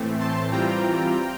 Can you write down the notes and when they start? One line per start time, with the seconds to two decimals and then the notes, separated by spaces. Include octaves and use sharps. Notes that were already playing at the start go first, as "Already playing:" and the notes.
Already playing: A2 E3 A3 C4
0.20 A5 C6
0.52 E3 G3 C4 F4 G5 A#5